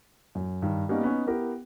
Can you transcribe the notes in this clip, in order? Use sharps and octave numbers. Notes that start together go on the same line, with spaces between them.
F#2
G2 D#3
G3 A#3 B3 C#4 D#4
B3 C#4 D#4
B3 E4 G4 A#4